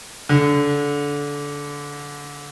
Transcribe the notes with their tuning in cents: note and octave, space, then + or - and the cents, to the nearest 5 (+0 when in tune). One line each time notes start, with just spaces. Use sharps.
D3 -20